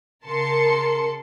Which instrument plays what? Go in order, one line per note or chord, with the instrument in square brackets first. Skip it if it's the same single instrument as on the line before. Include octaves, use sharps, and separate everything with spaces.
[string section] C#3 A#4 A5 C6 C#7